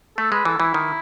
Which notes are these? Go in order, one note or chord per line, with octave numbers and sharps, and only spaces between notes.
A3 A4
G#3 B4
E3 A4
E3 E4
D#3